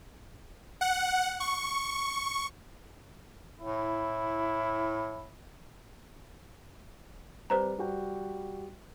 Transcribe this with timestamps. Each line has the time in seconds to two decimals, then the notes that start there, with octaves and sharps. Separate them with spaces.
0.81 F#5
1.40 C#6
3.61 A2 E4
7.50 G3 C4 B4 C5 A#5
7.78 G3 F#4 G5